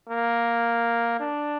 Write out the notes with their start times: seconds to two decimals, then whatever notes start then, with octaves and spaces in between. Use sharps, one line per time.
0.09 A#3
1.20 D4